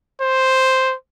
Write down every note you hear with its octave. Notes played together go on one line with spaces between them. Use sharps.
C5